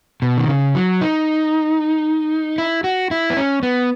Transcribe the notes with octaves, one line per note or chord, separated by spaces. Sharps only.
B2
D#3
C#3
F#3
D#4
E4
F#4
E4
B3
C#4
B3